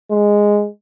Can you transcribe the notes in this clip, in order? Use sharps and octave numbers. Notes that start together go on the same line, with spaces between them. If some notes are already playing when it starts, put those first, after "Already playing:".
G#3